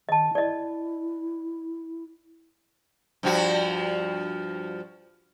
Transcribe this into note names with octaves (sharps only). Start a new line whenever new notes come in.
D#3 D#5 A5
E4 D5 D#5
G2 F3 F#4